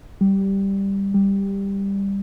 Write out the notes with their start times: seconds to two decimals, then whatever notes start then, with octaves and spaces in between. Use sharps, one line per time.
0.21 G3
1.14 G3